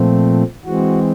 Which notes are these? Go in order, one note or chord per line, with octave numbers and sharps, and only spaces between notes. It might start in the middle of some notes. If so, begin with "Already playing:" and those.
Already playing: A#2 F3 A3 C4
E3 G#3 C4 F#4